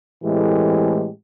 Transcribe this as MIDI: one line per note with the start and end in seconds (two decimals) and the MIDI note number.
0.24 1.10 45
0.24 1.10 52
0.24 1.10 56
0.24 1.10 57
0.24 1.10 60
0.24 1.10 67